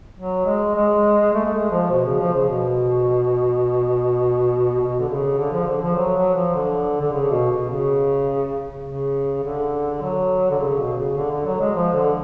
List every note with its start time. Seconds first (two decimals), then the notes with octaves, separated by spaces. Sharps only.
0.18 F#3
0.46 G#3
0.75 G#3
1.34 A3
1.45 A3
1.53 G#3
1.71 F3
1.91 B2
2.06 C#3
2.20 F3
2.34 C#3
2.48 B2
4.81 B2
5.00 D3
5.09 C#3
5.38 D3
5.53 F3
5.67 D3
5.81 F3
5.96 F#3
6.16 F#3
6.35 F3
6.55 D3
7.01 D3
7.12 C#3
7.31 B2
7.51 B2
7.69 C#3
8.86 C#3
9.44 D3
10.02 F#3
10.51 D3
10.60 C#3
10.79 B2
10.98 C#3
11.18 D3
11.31 D3
11.46 F#3
11.61 G#3
11.75 F3
11.94 D3